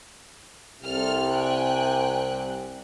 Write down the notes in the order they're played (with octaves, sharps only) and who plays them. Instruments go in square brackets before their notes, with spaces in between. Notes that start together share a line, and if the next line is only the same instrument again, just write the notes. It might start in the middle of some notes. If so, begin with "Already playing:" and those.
[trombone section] C2 C3 [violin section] A4 F6
[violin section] G5 G#5 F#6